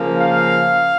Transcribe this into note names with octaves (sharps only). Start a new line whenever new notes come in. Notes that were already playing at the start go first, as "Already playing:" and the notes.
Already playing: C#3 F3 A#3
F5